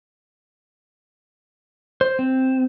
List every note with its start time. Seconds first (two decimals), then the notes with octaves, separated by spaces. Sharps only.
2.01 C5
2.19 C4